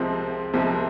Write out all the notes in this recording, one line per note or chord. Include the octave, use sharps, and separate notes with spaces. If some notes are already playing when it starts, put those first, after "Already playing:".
Already playing: C2 C3 F3 G#3 C4
C2 C3 F3 G#3 C4